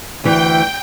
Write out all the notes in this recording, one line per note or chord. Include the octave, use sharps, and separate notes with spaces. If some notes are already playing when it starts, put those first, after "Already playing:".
D2 E3 G5